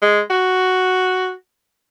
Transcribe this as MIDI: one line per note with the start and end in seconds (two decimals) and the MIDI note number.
0.02 0.20 56
0.30 1.31 66